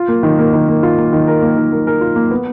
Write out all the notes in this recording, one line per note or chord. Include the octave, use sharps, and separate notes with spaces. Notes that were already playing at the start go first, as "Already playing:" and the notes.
Already playing: F4
A#3
D#3
A#3
D#3
A#3
F4
A#3
D#3
A#4
A#3
D#3
A#3
A#4
F4
A#3
B3